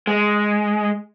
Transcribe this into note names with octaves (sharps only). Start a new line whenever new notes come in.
G#3